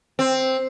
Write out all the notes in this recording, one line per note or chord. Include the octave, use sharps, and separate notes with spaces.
C4